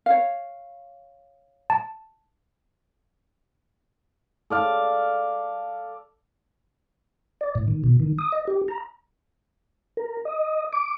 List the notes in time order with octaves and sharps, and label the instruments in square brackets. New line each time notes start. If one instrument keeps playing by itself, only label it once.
[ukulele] C#5 F5
[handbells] A5
[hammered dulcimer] A4 D5 F5
[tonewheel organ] D5
A2
D#3
B2
D#3
D#6
D#5
G4
A#5
A#4
D#5
D6